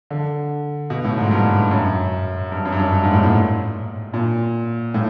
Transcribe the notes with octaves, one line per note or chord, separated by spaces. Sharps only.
D3
B2
A2
G#2
G2
F#2
G2
F#2
G2
F#2
G2
G#2
A2
A#2
A#2
A2